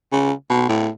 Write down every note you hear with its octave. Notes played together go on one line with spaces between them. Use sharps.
C#3
B2
A2